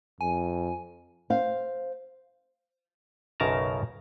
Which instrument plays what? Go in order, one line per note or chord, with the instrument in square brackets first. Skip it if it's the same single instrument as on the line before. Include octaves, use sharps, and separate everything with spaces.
[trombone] F2 [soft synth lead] G#5
[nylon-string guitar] C5 F5
[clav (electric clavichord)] B1 F#2 C#3 A#4 A5 A#5